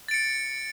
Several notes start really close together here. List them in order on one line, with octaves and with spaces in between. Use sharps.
A6 D7 C#7